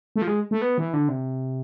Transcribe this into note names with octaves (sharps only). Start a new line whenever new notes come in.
A3
F3
G#3
A3
B3
E3
D3
C3